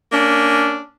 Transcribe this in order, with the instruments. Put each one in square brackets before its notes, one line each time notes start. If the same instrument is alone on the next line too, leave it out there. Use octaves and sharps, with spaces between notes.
[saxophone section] A#3 C#4 D4